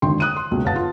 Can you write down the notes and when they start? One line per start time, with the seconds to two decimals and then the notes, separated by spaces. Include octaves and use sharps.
0.02 G#1 D3 G5 C6
0.20 D#6 F#6 D#7
0.37 C6
0.51 C#2 B2
0.65 G1 F5 F#5 A5 A6
0.76 F4